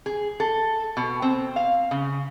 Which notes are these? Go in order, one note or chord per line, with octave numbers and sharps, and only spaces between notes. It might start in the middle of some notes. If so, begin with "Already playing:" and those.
G#4
A4
B2
C4
F5
C#3